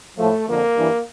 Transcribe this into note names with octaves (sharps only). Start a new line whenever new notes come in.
A2 F3 A3
F2 D3 F3 A#3
G2 E3